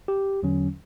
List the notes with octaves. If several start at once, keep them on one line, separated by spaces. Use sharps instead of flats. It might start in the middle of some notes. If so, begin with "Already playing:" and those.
G4
E2 D3 F#3 C#4